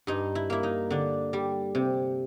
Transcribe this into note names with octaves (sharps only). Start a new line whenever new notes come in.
G2 D#4
E4
A#3 E4
D#4
D3 D4
G3
C3